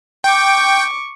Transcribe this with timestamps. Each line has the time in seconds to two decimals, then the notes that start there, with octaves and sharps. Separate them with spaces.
0.24 G5 C#6 D6